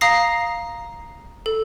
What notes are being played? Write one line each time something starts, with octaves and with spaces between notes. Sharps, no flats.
F5 A#5 D#6 A#6 C7
A4